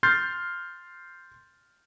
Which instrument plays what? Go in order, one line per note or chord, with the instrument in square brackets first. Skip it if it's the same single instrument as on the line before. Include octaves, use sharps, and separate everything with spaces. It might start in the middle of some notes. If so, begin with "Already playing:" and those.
[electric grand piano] C6 F6 G6 A6 C7